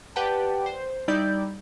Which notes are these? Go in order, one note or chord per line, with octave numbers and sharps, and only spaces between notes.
G4 B4 D5 F#5 G5 A5
C5
G3 D#4 E4 D5 G6